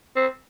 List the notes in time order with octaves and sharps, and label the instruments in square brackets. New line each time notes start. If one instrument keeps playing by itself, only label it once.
[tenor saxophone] C4